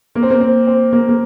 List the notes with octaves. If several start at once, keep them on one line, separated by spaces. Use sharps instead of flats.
A#3
C4
A#3
C4
C4
A#3
A#3